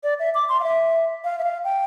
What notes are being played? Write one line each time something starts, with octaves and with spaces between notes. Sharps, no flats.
D5
E5
D6
C6
F5
E5
F5
E5
F5
G5